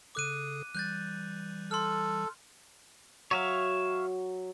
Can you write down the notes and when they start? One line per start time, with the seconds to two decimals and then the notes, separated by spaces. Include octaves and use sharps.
0.15 C#3 A4 D6 D#6 F#6 D#7
0.75 E3 G3 F#6 G6 A6
1.71 A4 C6 F6
3.31 F#3 C#5 E5 F5